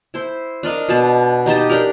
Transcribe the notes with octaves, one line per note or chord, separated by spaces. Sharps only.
E4 C5
D4 A#4 D#5 F5
B2 A5
D#4 G4 D#5 A5
D4 G4 A#4